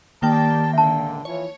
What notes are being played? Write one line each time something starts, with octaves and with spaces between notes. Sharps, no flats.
D#3 A#3 G4 D5 G5 A5
C#2 A#2 D3 E5 A5
E3 F3 C#5